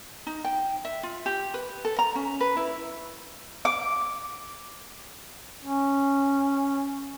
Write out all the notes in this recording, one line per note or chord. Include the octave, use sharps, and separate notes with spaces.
D#4
G5
E5
F4
G4
B4
A4
A#5
C#4
B4
E4
D6
C#4